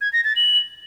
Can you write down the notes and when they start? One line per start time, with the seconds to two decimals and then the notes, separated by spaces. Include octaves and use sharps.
0.01 G#6
0.13 A#6
0.24 A6
0.36 F#7